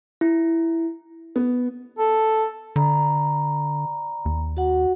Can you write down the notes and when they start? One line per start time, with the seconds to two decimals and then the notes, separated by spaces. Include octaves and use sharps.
0.21 E4
1.36 B3
1.99 A4
2.76 D3 D5 A#5 B5
4.25 D#2
4.57 F#4 F#5